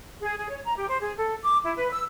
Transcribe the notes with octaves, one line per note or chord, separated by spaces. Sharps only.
G#4
G#4
C#5
A#5
G4
C5
G#4
A4
D6
E4
B4
E6